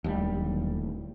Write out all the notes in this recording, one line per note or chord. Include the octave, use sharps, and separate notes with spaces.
D1 D#2 G3